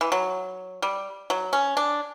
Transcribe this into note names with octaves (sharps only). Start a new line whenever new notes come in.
E3
F#3
G3
F#3
C#4
D4